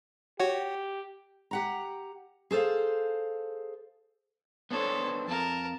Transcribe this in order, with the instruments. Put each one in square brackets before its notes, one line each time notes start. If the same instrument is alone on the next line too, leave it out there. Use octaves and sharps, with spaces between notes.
[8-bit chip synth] F#4 C#5 F#5 [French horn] G4
[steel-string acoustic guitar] G4 F#5 A#5
G#4 A4 C5 F5
[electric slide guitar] B3 D4 C5 [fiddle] A4 C#5
[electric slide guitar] F2 [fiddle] A#4 A5